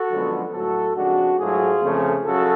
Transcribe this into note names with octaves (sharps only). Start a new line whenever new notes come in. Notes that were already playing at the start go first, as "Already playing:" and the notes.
Already playing: F#4 A4
F#2 D3 F3 G#3 B3
A2 F#3 A3 F#4 A4
F2 C#3 G#3 D4 F#4
G#2 F#3 A3 F4 G#4
F2 C#3 F3 A3
F#2 C#3 F#4 A4